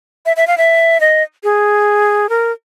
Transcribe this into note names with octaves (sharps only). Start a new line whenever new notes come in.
E5
E5
F5
E5
D#5
G#4
A#4